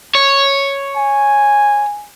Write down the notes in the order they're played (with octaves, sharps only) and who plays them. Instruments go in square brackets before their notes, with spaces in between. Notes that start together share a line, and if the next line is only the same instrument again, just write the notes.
[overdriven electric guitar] C#5
[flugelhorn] G#5